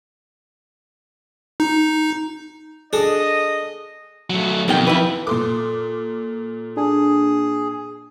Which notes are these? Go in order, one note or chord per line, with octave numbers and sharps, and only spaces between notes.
D#4
D4 G#4 A4 D#5
F#3 A3
B1 F2 D#3 G5
E4 B4
A#2 A4 C6 D6
D4 G#4